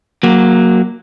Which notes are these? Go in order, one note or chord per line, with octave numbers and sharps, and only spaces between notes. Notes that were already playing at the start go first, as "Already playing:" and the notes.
F#3 A#3